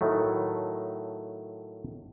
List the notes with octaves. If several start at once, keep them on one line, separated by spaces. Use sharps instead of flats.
A2 D#3 F#3 A3